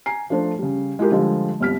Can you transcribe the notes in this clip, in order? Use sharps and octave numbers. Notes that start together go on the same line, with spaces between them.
G#5 A#5 C7
F3 A3 D4 C5
C#3 G3
G#3 E4 F4 G4 A#4
D3 F3 G3 G#3 F4
G1 C2 F6 B6